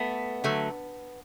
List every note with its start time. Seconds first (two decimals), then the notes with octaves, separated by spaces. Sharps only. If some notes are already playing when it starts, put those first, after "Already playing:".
Already playing: A3 B3
0.44 D3 F#3 A3